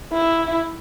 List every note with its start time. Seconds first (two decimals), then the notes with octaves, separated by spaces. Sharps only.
0.12 E4